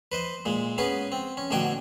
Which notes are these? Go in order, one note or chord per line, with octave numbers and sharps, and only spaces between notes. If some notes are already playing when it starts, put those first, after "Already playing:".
B4 C5 D#5
A#2 G#3
B3 C#4 G#4 B4
C4
C#4
A1 B2 D3 F#4 G5 G#5